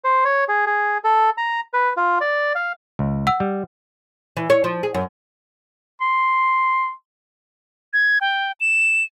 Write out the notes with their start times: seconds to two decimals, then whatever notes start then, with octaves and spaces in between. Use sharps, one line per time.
0.04 C5
0.25 C#5
0.48 G#4
0.66 G#4
1.04 A4
1.38 A#5
1.73 B4
1.97 F4
2.21 D5
2.55 F5
2.99 C#2
3.27 F#5 E6
3.40 G3
4.37 E3
4.50 C#5
4.64 F3
4.83 G#4
4.94 F#2
6.01 C6
7.93 G#6
8.21 G5
8.60 E7